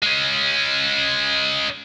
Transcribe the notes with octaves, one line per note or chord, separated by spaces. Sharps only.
G#3 C#4